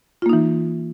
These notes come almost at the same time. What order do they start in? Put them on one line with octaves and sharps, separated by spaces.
F4 A#3 D#4 E3